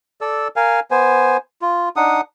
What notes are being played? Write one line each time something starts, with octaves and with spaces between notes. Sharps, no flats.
A4 D5 E6
A#4 F5 G#5
B3 C5 G#5
F4
D4 D#4 F#5 D#6